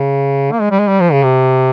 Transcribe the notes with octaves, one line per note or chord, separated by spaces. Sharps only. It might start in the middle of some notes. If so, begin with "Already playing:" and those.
Already playing: C#3
A#3
G#3
G3
G#3
G3
F3
C#3
C3